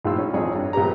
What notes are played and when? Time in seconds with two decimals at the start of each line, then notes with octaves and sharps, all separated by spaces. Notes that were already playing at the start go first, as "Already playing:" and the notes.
0.05 A#1 A2 D#4 F4 E6
0.18 C#4
0.33 G#1 F2 G#4 C#5
0.55 G2
0.73 A#1 F2 B3 G4 A#5